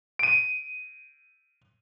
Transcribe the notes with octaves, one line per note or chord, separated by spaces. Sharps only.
D7 D#7